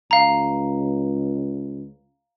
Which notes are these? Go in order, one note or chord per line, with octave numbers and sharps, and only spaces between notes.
C#2 F5 A#5